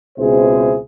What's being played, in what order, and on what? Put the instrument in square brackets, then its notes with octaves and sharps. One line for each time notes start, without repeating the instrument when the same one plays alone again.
[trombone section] C#2 B2 C4 E4 G#4 C5